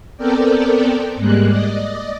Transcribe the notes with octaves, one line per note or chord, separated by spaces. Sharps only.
B3 C4 A4 A#4 D5 G5
G#2 G3 G#3 A#3 F#6
D5 D#5